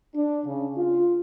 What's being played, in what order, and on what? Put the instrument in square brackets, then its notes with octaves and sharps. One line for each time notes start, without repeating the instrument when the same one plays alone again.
[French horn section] D4
C#3
F4